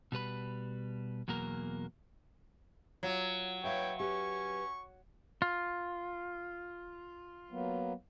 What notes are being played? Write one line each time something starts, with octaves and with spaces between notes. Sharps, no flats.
B2 G3 B4 B5
E2 B2 F#3 A#3 A#4
F#3 F4
B4 C#5 E5 F5 G5
G4 B4 G#5 C#6
F4
F#3 A#3 B3